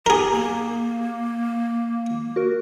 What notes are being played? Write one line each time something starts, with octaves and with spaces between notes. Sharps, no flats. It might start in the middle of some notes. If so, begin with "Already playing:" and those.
G4 G#4 A#4
A#3
F#4 A#4